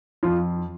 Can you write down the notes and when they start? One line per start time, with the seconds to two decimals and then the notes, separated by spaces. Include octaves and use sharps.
0.23 F2 F4